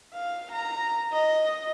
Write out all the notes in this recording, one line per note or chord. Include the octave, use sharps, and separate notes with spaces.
F5
A#5
D#5